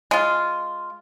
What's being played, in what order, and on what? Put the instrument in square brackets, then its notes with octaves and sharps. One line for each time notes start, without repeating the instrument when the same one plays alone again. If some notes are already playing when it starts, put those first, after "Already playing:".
[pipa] G#3 F4